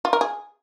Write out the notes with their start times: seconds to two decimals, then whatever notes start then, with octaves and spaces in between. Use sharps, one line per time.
0.05 F4
0.13 A#4
0.21 G#4